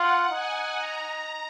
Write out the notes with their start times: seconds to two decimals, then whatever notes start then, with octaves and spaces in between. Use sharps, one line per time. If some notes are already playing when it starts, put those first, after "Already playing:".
Already playing: F4 F#5
0.30 D#4 G#5
0.76 A#5